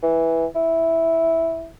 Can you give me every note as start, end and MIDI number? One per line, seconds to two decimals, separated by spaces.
0.03 0.46 52
0.55 1.67 64